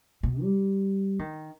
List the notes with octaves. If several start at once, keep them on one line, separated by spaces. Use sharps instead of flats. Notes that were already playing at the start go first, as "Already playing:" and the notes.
B2
G3
D#3